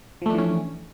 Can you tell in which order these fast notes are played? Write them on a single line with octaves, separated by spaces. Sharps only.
F3 A3 D4 E3 C#4